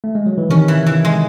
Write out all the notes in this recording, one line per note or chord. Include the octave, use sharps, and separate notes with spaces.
A3
G#3
F#3
E3
C3 D#3 C#4
E3
E3
G#3